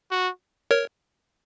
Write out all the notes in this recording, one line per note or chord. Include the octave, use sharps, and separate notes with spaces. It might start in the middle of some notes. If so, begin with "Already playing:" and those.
F#4
A#4 C#5